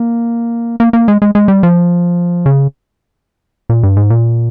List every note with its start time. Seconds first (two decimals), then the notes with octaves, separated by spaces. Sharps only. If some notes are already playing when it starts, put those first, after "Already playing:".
Already playing: A#3
0.80 A#3
0.93 A#3
1.08 G#3
1.22 G#3
1.35 G#3
1.48 G3
1.63 F3
2.46 C#3
3.69 A#2
3.83 G2
3.97 G#2
4.10 A#2